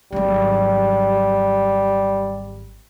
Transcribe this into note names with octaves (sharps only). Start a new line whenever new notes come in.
G#1 F#3 G3